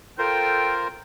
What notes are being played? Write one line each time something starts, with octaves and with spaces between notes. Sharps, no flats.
F4 A4 A#4 C5 G5